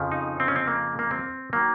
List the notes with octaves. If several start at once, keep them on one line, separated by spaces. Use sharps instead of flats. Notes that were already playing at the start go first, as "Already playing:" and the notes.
Already playing: F2 C#3 F3
D#4
C4
C#4
C4
A#3
A#3
C4
D#3 F#3 A#3